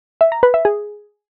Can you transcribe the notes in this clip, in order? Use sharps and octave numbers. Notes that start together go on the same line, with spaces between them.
E5
A#5
B4
E5
G#4